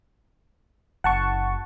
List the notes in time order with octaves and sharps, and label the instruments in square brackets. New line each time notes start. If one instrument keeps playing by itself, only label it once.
[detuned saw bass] F#1 [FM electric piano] F#5 A5 C#6